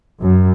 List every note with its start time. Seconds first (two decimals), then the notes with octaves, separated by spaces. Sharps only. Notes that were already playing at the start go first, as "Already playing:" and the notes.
0.22 F#2